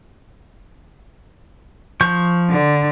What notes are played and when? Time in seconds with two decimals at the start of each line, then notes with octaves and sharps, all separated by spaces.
2.01 F3 C#6 G6
2.51 D3